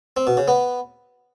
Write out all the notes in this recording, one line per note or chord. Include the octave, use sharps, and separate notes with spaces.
C4
B2
C#3
B3